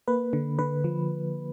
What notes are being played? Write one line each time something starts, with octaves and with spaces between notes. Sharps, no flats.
A#3 B4
D3
D3 B4
F3